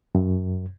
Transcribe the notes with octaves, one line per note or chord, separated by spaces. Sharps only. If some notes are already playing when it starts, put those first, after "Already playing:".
F#2